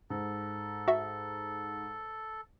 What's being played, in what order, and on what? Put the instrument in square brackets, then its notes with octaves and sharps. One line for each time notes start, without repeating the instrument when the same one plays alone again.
[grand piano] G#2 [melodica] A4
[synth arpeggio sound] F#4 E5